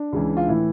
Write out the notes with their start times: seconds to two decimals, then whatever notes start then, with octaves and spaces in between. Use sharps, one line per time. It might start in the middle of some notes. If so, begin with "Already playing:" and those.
Already playing: D4
0.12 C#2 C#3 E3
0.37 F4
0.47 A2 E3 E4